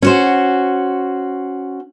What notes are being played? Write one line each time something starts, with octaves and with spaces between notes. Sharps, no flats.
C#4 F#4 C5